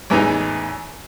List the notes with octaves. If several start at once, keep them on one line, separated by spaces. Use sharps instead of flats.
A1 E2 E3 G#3 D#4 G#5